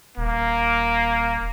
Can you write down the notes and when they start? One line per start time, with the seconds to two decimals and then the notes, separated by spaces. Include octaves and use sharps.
0.18 D#1 A#3